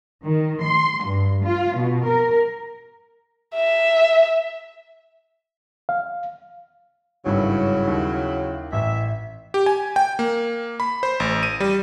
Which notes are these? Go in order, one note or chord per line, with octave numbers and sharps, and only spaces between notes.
D#3
C6
G2
F4
B2
A#4
E5
F5
G#1 G2 C#3 F#3 E4
D#2
A1 E5
G4
G#5
G5
A#3
B5
C5
A1
D#7
G3